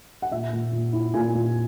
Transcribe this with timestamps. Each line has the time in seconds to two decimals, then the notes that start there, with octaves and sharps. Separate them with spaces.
0.22 F#5
0.32 A#2 E5
0.53 A#2
0.72 A#2
0.93 E4
1.14 A#2 G#5
1.35 A#2